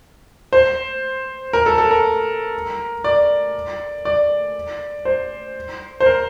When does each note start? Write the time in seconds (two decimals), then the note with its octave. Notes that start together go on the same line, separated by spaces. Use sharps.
0.53 C5
1.53 A#4
1.66 A4
1.78 A4
1.91 A#4
3.04 D5
4.05 D5
5.05 C5
6.00 C5
6.06 A#4